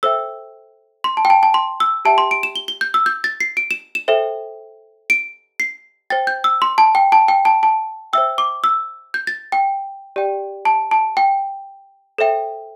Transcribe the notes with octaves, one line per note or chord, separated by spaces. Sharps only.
A4 C5 E5 G5 E6
C6
A5
G5
A5
A5
C6
E6
G4 E5 G5 A5
C6
D7
E7
G7
G7
G6
E6
G6
A6
C7
D7
E7
E7
A4 C5 E5 G5
D7
C7
C5 G5 A6
G6
E6
C6
A5
G5
A5
G5
A5
A5
C5 E5 G5 E6
D6
E6
G6
A6
G5
G4 D5 G5
A5
A5
G5
A4 C5 E5 G5